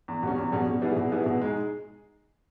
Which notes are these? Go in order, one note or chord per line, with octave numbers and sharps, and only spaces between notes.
E2
B2 G3 C#4
E2
B2 G3 C#4
B2
G3 B3 E4 G#4
B2
G3 B3 E4 G#4
B2
G#3 D#4 G#4